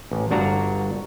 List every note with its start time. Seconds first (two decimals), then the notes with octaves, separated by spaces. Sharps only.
0.11 A1
0.31 G1 D4 F#4 A#5